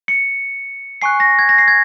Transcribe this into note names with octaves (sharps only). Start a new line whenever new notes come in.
C#7
G#5 C#6 F#6 C7
A#6
G#6
A#6
C7
G#6